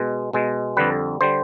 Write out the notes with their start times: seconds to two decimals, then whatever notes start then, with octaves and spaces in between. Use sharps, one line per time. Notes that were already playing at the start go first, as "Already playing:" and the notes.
Already playing: B2 G#3
0.33 B2 G#3
0.77 F2 D3 G3 B4
1.21 D3 G3 C5